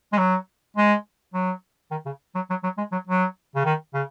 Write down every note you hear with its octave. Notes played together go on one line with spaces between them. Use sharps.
G#3
F#3
G#3
F#3
D#3
C#3
F#3
F#3
F#3
G#3
F#3
F#3
C#3
D#3
C#3